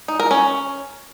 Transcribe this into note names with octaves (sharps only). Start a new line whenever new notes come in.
D#4
A#4
C#4